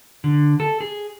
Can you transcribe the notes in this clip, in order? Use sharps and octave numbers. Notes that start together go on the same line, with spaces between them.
D3
A4
G#4